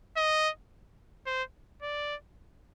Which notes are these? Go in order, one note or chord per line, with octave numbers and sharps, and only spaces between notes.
D#5
C5
D5